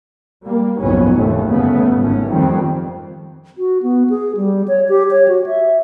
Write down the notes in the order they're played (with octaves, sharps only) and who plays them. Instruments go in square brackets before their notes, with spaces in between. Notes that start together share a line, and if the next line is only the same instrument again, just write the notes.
[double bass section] G3 A#3
F#1 B1 F2 G#2 B3 C#4
A#1 D#2 A3
G1 C#3 A3 B3
G#1 A3 C#4
F2 D#3 G3 C4
[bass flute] F#4
B3
G#4
G3
C#5
G4
C#5
F#4
E5